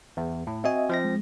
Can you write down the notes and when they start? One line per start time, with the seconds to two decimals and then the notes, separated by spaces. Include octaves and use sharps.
0.17 E2
0.47 A2
0.64 C4 F#4 D#5 E5 G#5
0.89 F3 C4 A#6
1.05 G#3